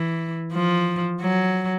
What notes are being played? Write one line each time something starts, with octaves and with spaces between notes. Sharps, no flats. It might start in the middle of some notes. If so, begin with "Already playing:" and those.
Already playing: E3
F3
F#3